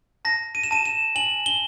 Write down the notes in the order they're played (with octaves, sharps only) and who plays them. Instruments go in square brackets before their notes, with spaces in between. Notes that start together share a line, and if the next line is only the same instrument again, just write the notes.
[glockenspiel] A5 A#6
D#7
E7
A5 D#7
E7
G#5 F#7
G7